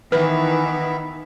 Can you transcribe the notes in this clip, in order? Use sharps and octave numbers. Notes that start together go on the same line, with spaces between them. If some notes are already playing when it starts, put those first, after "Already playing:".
D#3 E3 B3 E4 B4 E5